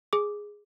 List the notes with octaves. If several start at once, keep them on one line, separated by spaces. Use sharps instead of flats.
G#4 D6